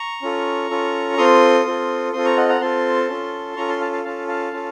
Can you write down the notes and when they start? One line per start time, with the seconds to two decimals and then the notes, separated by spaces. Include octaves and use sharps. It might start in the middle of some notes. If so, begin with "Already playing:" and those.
Already playing: A#5 C#6
0.22 C#4 F4 A4
0.70 C#4 F4 A4
1.17 C4 F4 A4 C6 D#6
1.66 C4 F4 A4
2.13 C4 F4 A4 C6 D#6
2.25 A#5 C#6
2.37 D#5 F#5
2.49 F#5 A#5
2.60 C4 F4 A4 A5 C6
3.09 C#4 F4 A4
3.56 C#4 F4 A4 A#5 C#6
3.68 A5 C6
3.81 F5 A5
3.93 F5 A5
4.04 C#4 F4 A4 F5 A5
4.28 F5 A5
4.53 C#4 F4 A4